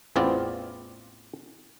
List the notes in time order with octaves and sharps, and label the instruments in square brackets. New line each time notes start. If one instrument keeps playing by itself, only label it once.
[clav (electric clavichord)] A1 E2 B3 C4 F4 D5